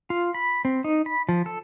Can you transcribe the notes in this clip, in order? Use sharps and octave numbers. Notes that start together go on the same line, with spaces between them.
F4
B5
C4
D#4
B5
F3
A4